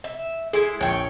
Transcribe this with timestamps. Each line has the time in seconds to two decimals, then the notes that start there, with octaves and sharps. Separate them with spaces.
0.04 E5
0.53 G#3 E4 G#4
0.81 A#1 C#5 G5